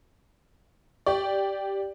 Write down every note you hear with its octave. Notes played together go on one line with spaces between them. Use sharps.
G4 D5